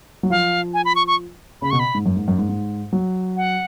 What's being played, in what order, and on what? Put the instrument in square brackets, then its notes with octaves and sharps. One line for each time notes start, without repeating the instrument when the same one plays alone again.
[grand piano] F#3
[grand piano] F3 [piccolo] F5
[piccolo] G#5
B5
C#6
C#6
[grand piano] C#3 [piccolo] B5
[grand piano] B2 [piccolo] C#6
[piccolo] B5
[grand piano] G#2
F#2
G#2
F#2
G#2
G#2
F#3
[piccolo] F#5